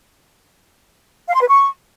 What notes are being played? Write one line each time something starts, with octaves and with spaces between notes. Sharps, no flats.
F5
C6
B4
C#6